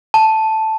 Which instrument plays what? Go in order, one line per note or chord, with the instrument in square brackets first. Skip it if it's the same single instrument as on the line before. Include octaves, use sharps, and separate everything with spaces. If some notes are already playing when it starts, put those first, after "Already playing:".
[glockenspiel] A5